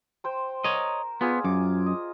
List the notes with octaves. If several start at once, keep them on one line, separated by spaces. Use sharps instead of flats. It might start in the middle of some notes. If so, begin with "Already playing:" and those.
C5 G5 C6
A#4 C#5 D#5
B3 F4 G#4 D5
F#2 D6
D#5